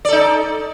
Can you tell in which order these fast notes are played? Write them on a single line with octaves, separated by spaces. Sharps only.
D5 A4 D#4